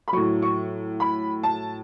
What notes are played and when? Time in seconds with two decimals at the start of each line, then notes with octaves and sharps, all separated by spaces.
0.08 B5
0.12 A2 F#3 C#6
0.42 C#6
1.00 B5
1.43 A5